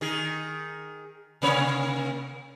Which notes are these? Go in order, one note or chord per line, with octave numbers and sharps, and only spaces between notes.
D#3 G#4
C3 A#3 C#5